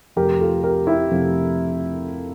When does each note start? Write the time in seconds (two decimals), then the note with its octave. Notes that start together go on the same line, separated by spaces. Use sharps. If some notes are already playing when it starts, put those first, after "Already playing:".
0.16 F2 C3 F3 A3 G4 A#4
0.40 F4 A4
0.64 G4 A#4
0.87 E4 G4
1.11 F2 C3 F3 A3